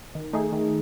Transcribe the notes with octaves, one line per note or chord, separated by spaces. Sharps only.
D#3
A3 D#4 G#4
D#3